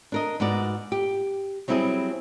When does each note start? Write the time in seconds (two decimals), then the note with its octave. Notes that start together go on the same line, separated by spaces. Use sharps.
0.12 D4 A#4 D#5
0.40 G#2 B3 F#4 D5
0.92 G4
1.68 F#3 G3 C4 E4 F#4 G#4